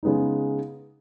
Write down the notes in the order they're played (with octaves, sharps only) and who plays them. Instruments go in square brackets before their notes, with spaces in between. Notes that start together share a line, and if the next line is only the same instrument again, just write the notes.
[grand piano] C#3 G#3 B3 D#4